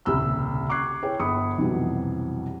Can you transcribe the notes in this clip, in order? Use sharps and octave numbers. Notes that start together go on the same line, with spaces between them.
D#1 C2 C#3 E6 F6
C#6 D6 F#6 G#6 C7
E4 G#4 C#5 G5
G1 B5 D#6 C#7
B1 F2 C3 E3 F#3 G3